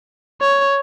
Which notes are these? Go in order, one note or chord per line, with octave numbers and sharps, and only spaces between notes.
C#5